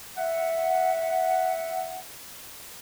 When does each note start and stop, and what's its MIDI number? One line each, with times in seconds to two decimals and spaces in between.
0.18 1.98 76
0.18 1.98 78